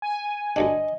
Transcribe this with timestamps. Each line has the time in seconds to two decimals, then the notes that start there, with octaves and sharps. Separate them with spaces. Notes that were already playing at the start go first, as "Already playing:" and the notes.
0.02 G#5
0.56 D2 G2 D4 D#5